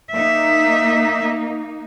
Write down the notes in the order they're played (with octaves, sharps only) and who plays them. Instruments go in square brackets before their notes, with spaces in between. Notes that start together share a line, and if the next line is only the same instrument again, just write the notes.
[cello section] A#3 D#4 [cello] E5